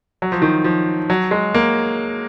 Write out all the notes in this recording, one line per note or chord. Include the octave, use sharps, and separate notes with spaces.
F#3
F3
D#3
F3
F#3
G#3
A#3